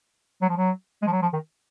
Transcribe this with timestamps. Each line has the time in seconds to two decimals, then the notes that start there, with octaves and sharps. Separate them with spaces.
0.42 F#3
0.49 F3
0.57 F#3
1.02 G#3
1.07 F3
1.12 F#3
1.22 F3
1.33 D#3